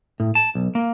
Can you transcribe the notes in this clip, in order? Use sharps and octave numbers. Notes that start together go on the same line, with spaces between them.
A2
A5
B1
A#3